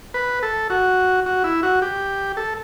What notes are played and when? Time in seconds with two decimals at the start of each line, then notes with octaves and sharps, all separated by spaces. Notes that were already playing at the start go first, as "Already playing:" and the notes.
0.14 B4
0.43 A4
0.70 F#4
1.26 F#4
1.44 E4
1.63 F#4
1.82 G4
2.37 A4